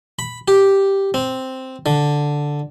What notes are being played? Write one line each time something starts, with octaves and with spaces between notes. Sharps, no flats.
B5
G4
C4
D3